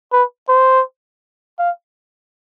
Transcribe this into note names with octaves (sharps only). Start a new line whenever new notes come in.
B4
C5
F5